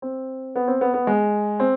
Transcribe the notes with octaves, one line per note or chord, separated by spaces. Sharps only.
C4
B3
C4
B3
B3
G#3
C4